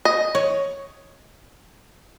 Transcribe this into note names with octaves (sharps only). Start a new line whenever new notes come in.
D#5
C#5